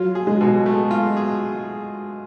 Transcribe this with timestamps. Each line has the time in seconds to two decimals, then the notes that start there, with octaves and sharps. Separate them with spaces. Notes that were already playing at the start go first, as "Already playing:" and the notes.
Already playing: F#3 F4
0.15 G#4
0.27 G#3
0.41 B2
0.66 A3
0.91 F4
1.17 G#4